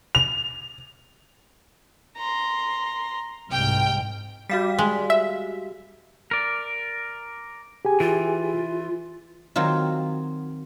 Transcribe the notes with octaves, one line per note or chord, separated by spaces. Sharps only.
F7
A#5 C6
C2 G#2 G5 F6
G3 F#4 F5 B6
G#3
E5
A#4 D5
G4 G#4 G#5
E3 F4
D#3 F#3 C4 F4